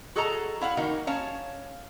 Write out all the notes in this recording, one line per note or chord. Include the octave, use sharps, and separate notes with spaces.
F#4 G#4 A4 D#5 A5 A#5
E4 F5 F#5
D#3 A#3 D#4 F#4
C#4 C#5 F5 A5